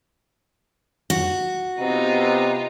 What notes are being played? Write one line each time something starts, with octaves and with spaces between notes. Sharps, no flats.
F#4
C3 B3 D#4 F4